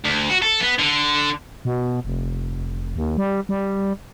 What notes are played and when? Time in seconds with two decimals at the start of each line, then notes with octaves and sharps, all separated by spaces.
0.05 D2
0.30 F#4
0.42 A4
0.60 B3
0.79 D3
1.65 B2
2.05 F1
2.96 D#2
3.18 G3
3.49 G3